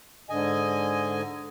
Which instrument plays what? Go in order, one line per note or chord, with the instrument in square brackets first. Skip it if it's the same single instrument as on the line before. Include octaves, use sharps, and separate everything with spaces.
[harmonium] G#2 D3 D#5 G#5